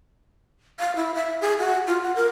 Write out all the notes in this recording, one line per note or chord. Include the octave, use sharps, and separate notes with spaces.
F5
E4
E5
G#4
F#4
F4
F#5
A#4